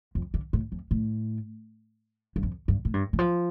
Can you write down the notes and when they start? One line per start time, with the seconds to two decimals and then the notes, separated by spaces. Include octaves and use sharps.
0.15 F2
0.34 D3
0.53 A2
0.72 F2
0.91 A2
2.36 G2
2.43 F2
2.68 G2
2.85 A2
2.94 G2
3.13 E3
3.19 F3